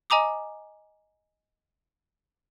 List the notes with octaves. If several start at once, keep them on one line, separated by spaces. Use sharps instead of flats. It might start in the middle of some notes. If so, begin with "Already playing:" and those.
D#5 G#5 A#5 D6 D#6